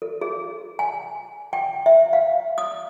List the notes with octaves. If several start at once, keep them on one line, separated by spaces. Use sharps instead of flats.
A4
G#4
G#5
G5
E5
F5
D#6